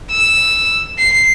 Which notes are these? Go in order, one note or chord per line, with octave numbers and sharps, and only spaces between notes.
E6
C7